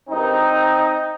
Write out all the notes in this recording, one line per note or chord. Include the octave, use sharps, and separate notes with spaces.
G#1 G2 D#3 C4 D#4